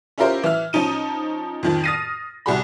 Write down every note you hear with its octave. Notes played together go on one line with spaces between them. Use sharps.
C#4 E4 F4 G4 A#4 C5
E3 E5 F6
F3 C#4 D#4 D#7
F2 D#3 F3
D#6 F6 A6 A#6 C7 D#7
C2 G3 F#4 G#4 B5